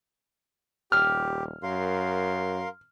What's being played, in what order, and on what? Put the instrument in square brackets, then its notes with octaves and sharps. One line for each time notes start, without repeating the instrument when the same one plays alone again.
[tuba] D#1 [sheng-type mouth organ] G4 [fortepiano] F6
[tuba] F#2 [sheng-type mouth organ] A#4 F5 C6